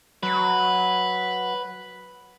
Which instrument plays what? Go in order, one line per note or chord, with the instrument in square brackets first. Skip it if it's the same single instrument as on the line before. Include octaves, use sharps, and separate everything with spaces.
[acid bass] F#3 [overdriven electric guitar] B4